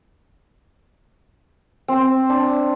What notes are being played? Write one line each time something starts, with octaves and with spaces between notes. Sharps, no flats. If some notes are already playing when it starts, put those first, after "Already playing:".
C4
D4